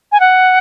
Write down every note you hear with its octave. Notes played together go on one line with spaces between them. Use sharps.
G#5
F#5